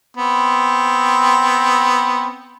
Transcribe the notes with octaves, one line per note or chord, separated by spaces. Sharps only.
B3 C4